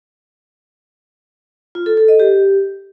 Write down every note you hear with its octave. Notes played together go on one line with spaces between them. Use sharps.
F4
A4
A4
D#5
G4